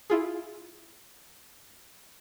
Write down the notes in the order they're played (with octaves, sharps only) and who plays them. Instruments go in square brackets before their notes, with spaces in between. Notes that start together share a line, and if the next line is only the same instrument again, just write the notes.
[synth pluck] E4 F4 G#4